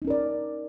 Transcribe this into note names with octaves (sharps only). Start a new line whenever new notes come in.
C#4 D#4 A#4 D5